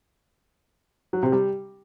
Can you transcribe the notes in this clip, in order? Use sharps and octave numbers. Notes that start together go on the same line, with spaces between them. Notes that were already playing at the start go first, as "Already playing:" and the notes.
F#3
C3
G3